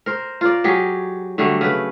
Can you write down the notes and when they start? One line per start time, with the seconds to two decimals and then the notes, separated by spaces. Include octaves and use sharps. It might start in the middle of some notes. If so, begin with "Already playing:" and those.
0.06 A#4 C5
0.41 F4 A#4 D5
0.64 F#3 G4 G#4
1.38 D3 F#3 G3 A3
1.61 C#3 B4